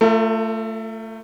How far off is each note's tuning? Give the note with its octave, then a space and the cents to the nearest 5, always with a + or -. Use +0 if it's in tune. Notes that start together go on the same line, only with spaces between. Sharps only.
A3 +15 F4 -15 A#4 -45